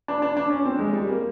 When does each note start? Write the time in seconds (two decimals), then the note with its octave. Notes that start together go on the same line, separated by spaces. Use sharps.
0.08 D4
0.22 D4
0.37 D4
0.50 C#4
0.66 C4
0.79 G#3
0.93 G3
1.08 A#3